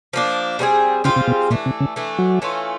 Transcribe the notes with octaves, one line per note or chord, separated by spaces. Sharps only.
F3 A#3 D4
G3 C4 F4 G#4
C#3 G3 C4 F4 G#4
C3
B2
A#2 E3 A3 D4
C3
C#3
E3 A3 D4
F#3
E3 A3 C#4 F4